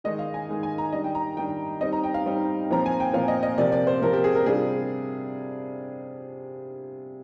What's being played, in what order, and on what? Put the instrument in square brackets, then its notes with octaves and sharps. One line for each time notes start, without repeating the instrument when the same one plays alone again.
[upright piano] D#3 G#3 D#4 D#5
F5
G#5
D#3 G#3 D#4
G#5
A#5
D#3 G3 D4 D#5
G5
A#5
D#3 G3 D4 G5
G3 C4 D#4 D#5
A#5
G5
F5
G3 C4 D#4
A#2 F3 C4 A#5
G#5
G5
A#2 F3 C4 F5
D#5
D#5
C3 F3 A#3 D5
D5
C5
C3 F3 A#3 A#4
G4
G#4
A#4
C3 G3 D4 F4 G#4